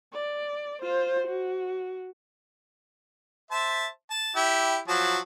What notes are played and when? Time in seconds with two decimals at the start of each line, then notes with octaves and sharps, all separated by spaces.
0.13 D5
0.82 F4 C5
1.27 F#4
3.51 C5 E5 A5
4.11 A5
4.36 E4 G4
4.88 F3 F#3 A5